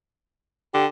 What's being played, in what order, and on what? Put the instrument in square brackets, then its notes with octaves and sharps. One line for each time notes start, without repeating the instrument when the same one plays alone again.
[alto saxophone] D3 [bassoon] G4